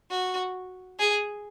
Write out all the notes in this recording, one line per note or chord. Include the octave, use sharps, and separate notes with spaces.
F#4
G#4